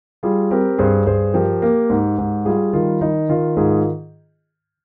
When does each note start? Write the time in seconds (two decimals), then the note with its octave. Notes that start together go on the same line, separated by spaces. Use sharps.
0.23 G3 F4 G#4
0.51 C4 G4 A#4
0.78 G2 G#4 C5
1.06 G2 G#4 C5
1.34 F3 G4 A#4
1.62 A#3
1.90 G#2
2.18 G#2
2.45 G3 F4 G#4
2.73 D#3 F4
3.01 D#3 D#4
3.29 D#3 F4
3.57 G#2 F4 G#4